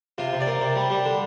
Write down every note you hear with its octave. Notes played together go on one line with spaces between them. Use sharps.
C3 F4
C3
D5
A#3
C3
G3
G3
D3